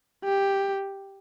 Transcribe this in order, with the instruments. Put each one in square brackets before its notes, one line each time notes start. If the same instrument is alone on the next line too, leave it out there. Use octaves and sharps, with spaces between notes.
[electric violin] G4